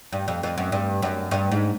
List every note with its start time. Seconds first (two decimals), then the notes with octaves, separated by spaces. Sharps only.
0.12 G2
0.28 F2
0.43 F2
0.58 F#2
0.72 G2
1.02 F#2
1.31 G2
1.51 G#2